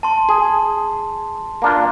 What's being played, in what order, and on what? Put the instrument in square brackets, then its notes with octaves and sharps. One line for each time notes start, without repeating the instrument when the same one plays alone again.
[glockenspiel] A5 C6
[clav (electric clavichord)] G#4
A#3 D4 F4